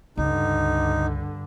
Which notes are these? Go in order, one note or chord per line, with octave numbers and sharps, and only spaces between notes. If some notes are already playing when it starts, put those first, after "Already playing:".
C#2 G2 D3 D#4